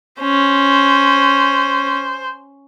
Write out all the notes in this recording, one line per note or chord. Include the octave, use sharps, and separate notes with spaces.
C#4 C5